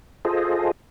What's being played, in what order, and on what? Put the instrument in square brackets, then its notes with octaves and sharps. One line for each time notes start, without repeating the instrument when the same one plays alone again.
[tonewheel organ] F4 G#4 A4 C5 D#5